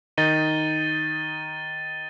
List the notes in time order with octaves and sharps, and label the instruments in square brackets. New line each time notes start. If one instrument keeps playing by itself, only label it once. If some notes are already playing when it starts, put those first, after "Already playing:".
[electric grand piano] D#3 D#4 [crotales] A6 D#7 G7